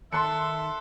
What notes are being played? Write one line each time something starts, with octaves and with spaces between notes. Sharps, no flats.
D#3 A4 E5 C6 F#6 C#7